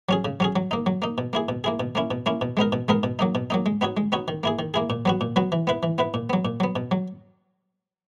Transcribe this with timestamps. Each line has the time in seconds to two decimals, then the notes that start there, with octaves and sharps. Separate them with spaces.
0.09 F#3 C#4 G#4
0.25 C#3
0.40 F#3 C#4 G#4
0.56 F#3
0.71 A#3 D#4
0.86 F#3
1.02 A#3 D#4
1.18 B2
1.33 A#3 E4 G#4
1.49 B2
1.64 A#3 E4 G#4
1.80 B2
1.95 A#3 C#4 E4
2.11 B2
2.26 A#3 C#4 E4
2.41 B2
2.57 G#3 B3 D#4 A#4
2.72 B2
2.88 G#3 B3 D#4 A#4
3.03 B2
3.19 F#3 A#3 D#4
3.35 B2
3.50 F#3 A#3 D#4
3.66 G#3
3.81 B3 D#4 F#4 C#5
3.97 G#3
4.12 B3 D#4 F#4 C#5
4.28 D#3
4.43 A#3 E4 G#4
4.59 D#3
4.74 A#3 E4 G#4
4.90 A#2
5.05 F#3 B3 F#4
5.21 A#2
5.36 F#3 B3 F#4
5.52 E3
5.67 B3 E4 B4
5.83 E3
5.98 B3 E4 B4
6.14 A#2
6.30 F#3 B3
6.45 A#2
6.60 F#3 B3
6.76 B2
6.91 F#3